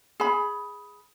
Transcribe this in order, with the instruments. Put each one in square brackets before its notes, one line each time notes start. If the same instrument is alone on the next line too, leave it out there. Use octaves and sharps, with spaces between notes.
[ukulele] G#4 B5